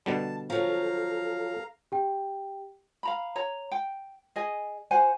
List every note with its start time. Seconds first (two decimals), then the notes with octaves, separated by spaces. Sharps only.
0.06 B2 D3 G3 A5
0.50 F3 F#3 A4 F5 A#5
1.92 G4 G5
3.03 F5 A#5 B5
3.36 C#5 A#5
3.71 G5
4.36 G#4 D#5 G#5
4.91 F#4 C5 F#5 G#5